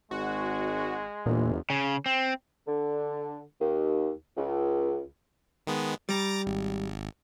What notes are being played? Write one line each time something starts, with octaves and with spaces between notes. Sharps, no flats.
G#1 G#3 F#4
G1 E2 A#2
C#3
C4
D3
D#2
C#2
D#3 G#3 B3
G3 A#5 D6 A6
G#1